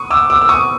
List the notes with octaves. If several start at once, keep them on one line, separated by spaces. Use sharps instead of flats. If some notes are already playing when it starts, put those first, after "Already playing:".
Already playing: C#6 D#6
D6 E6
D6 E6
E6
C#6 D#6